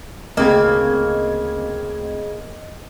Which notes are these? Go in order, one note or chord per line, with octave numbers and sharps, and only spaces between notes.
D2 C#3 A#3 C4 D#5 G#6